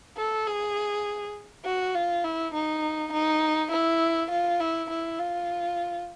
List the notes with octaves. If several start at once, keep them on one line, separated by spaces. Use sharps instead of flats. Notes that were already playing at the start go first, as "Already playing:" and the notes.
A4
G#4
F#4
F4
E4
D#4
D#4
E4
F4
E4
E4
F4